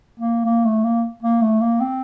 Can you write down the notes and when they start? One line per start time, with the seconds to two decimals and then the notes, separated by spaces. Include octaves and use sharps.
0.20 A#3
0.46 A#3
0.65 A3
0.84 A#3
1.23 A#3
1.42 A3
1.61 A#3
1.81 C4